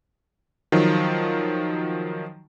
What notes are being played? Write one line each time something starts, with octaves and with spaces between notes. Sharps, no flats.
D#3 F3 F#3